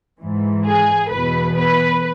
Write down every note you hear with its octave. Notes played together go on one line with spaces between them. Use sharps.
G#2 E3
G#4
E2 B2 B4
B4